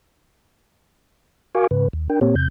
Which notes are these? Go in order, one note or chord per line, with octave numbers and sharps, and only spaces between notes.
F#4 A#4 F5 G#5 C#6 D6
G#2 C#3 B4
D#2
D4 A#4 G5
A#2 A#3 C4 G4 C#5
E2 C3 G6